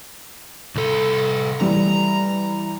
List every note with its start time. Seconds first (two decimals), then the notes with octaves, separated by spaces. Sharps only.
0.75 C2 A4
1.61 E3 G3 A#5